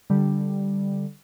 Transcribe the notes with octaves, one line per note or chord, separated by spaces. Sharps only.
D3 G3